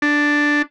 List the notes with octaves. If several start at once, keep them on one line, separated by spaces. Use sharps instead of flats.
D4